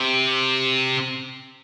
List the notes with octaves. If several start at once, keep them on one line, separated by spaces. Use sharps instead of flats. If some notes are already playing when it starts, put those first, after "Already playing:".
Already playing: C3